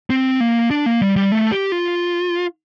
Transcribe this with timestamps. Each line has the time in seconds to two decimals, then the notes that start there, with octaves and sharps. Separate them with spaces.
0.10 C4
0.40 A#3
0.71 D4
0.86 A#3
1.01 G3
1.16 G3
1.32 A3
1.52 G4
1.72 F4